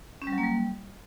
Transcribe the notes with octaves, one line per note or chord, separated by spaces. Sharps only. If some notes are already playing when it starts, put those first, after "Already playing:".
C#4
G3
F#3
A#3
G3